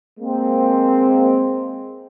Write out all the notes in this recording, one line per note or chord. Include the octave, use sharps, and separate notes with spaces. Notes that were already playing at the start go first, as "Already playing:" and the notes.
G#3 A#3 C4